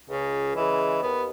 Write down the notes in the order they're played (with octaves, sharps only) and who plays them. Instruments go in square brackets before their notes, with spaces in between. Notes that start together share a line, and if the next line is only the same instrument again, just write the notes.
[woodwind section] C#2 [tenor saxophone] C#3
[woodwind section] C#3 G#3 [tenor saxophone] E3
[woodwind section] D#2 [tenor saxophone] B3